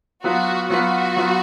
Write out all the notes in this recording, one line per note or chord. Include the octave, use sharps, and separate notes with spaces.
F#3 B3 F4 F#4 B4 F5
F#3 B3 F4 F#4 B4 F5
F#3 B3 F4 B4 F5